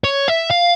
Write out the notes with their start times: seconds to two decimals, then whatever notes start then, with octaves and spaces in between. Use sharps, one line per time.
0.04 C#5
0.28 E5
0.50 F5